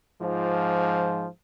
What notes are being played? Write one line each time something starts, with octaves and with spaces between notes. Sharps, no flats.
G#2 F3